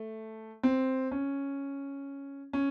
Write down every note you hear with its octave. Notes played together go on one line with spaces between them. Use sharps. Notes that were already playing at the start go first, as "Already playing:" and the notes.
Already playing: A3
C4
C#4
C#4